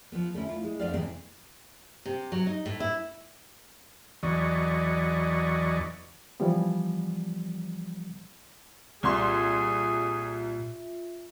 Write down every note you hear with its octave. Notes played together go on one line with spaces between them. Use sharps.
F3 B3
D3 A3 C#4 E4
F4
G#3
F2 B3 D4 C5 D5 F5
G#2 C3 E3 B3 C4 C5
C3
F#3
D#4
A2
E4
E2 E3 F#3 D5 D#5 C#6
E3 F3 G3 B3
C2 A#2 F4 G#4 E5 C6